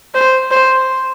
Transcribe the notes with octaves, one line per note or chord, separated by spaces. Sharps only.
C5
C5